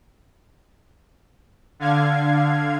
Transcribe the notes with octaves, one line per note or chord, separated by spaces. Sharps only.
D3 F5 G#6